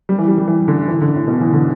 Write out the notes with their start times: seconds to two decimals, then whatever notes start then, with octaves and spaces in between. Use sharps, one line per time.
0.09 G3
0.19 E3
0.28 G3
0.38 G3
0.48 E3
0.68 D3
0.88 E3
1.01 D3
1.15 A2
1.28 B2
1.41 E3
1.54 D3